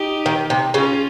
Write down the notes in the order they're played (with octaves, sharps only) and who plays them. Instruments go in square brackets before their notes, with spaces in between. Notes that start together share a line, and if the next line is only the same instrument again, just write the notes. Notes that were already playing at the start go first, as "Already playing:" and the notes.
Already playing: [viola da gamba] D#4 G4
[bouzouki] D#3
C3
[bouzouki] C#3 [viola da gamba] C#4 F4